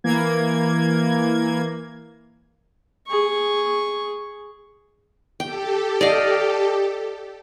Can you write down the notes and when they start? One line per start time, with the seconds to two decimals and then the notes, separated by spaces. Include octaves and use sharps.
0.04 E3 A#3 G#6
3.08 G#4 C#6
5.40 G4 A4 G5
6.01 D5 D#5 F5